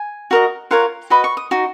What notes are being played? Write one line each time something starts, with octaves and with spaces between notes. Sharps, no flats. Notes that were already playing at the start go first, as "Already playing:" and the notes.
Already playing: G#5
F#4 A#4 D#5
F4 A#4 C#5 F#5
F#4 B4 D#5 B5
C#6
D#6
D#4 F#4